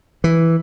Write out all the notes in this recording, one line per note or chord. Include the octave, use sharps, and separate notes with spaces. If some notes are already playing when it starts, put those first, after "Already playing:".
E3